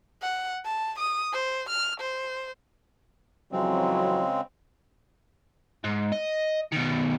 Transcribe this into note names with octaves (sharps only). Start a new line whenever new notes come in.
F#5
A5
D#6
C5
F6
C5
F2 C#3 E3 F#3 G#3 C4
G#2
D#5
B2 D#3